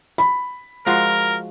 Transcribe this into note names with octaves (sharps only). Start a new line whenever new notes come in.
B5
F3 G#3 F#4 A#4